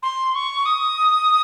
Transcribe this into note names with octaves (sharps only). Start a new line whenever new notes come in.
C6
C#6
D#6